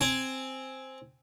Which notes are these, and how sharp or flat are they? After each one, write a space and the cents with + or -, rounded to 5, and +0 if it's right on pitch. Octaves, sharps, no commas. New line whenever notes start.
C4 +0 G#5 +0